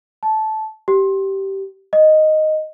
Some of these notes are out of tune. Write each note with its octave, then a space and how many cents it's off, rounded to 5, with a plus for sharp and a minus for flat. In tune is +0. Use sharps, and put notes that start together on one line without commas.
A5 -15
G4 -15
D#5 +0